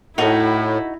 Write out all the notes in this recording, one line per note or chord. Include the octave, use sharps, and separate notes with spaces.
A2 A3 D#4 E4 F#4 A4